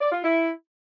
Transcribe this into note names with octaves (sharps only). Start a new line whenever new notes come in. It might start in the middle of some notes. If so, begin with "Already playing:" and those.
D5
F4
E4